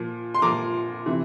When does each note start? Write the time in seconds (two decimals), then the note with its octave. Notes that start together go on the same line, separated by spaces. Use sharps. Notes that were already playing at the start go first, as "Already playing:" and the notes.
Already playing: A#2 F3
0.35 C6
0.42 A#2 F3 A#5 D6
1.06 C3 E3